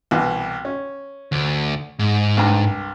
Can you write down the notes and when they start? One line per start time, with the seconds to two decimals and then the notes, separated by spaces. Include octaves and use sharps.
0.11 C2 B2 E3
0.65 C#4
1.32 D2
1.99 G#2
2.37 C2 G2 A#5